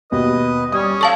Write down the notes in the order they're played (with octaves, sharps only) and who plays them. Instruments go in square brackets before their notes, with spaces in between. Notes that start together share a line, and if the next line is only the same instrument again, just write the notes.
[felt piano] D#2 B2 [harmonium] B4 D#5 [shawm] D#6
[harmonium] G3 [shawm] C#4 [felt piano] D#6
[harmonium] A4 [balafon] F5 A5 C#6